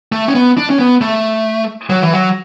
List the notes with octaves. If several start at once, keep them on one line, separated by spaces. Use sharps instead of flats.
A3
C#4
B3
D4
C#4
B3
A3
F#3
E3
F#3